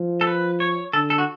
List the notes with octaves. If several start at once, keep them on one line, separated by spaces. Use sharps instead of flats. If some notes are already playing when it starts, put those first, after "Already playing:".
Already playing: F3
A4
B4
C#5
D3 A4
A4
F#4